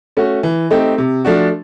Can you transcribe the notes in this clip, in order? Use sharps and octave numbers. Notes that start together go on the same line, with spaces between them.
A3 C#4 F#4
E3
A3 C4 D#4 G4
C3
F3 A3 D4 F#4